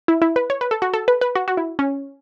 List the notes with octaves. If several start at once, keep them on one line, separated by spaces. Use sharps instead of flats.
E4
E4
B4
C#5
B4
A4
F#4
A4
B4
B4
F#4
F#4
E4
C#4